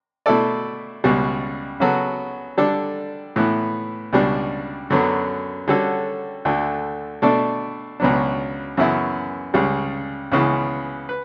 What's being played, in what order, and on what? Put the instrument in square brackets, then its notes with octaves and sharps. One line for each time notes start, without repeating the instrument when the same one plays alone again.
[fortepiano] B2 A3 E4 A4 D5
C#2 B2 G3
C#3 F#3 B3 F#4 A4
D3 G3 D4 A4
A2 E3 B3
C#2 B2 G3 D4
F#2 D3 F#3 B3
D3 G3 C#4 F#4 A4
D2 D3 A3
B2 A3 D4 A4 D5
C#2 B2 F#3 B3 D4
F#2 C#3 E3 B3 E4
C#2 C#3 G3
C#2 C#3 E3 B3
B4